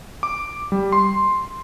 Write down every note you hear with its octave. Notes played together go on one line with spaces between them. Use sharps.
D6
G3
C6